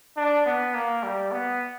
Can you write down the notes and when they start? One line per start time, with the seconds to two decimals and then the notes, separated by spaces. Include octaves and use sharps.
0.17 D4
0.46 B3
0.75 A#3
1.03 G3
1.31 B3